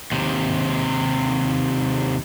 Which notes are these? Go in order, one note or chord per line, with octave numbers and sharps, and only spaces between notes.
D#2 C3